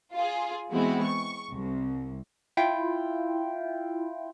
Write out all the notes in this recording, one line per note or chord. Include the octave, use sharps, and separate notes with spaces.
F4 G#4
E3 G#3 B3 C4 E4 F#4
C#6
C2
E4 F4 G5